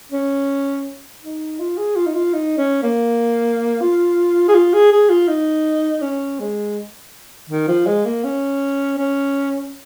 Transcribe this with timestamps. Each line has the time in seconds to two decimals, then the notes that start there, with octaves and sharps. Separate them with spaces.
0.11 C#4
1.22 D#4
1.59 F4
1.77 G#4
1.96 F4
2.07 D#4
2.14 F4
2.34 D#4
2.58 C#4
2.82 A#3
3.81 F4
4.48 G#4
4.54 F4
4.73 G#4
4.92 G#4
5.09 F4
5.28 D#4
6.01 C#4
6.39 G#3
7.50 D#3
7.67 F3
7.87 G#3
8.05 A#3
8.24 C#4
8.97 C#4